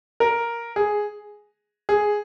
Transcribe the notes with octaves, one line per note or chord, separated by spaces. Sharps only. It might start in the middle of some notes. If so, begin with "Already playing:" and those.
A#4
G#4
G#4